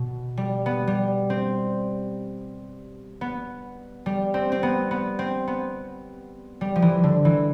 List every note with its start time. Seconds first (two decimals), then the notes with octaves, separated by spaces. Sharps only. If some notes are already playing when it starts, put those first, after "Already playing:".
Already playing: B2
0.37 G3
0.66 B3
0.87 G3
1.30 C4
3.21 B3
4.06 G3
4.34 C4
4.52 C4
4.63 B3
4.91 B3
5.19 C4
5.47 B3
6.61 G3
6.76 F3
6.82 E3
7.03 D3
7.25 E3